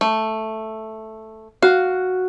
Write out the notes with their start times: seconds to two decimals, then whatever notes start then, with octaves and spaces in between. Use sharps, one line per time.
0.01 A3
1.62 F#4 F5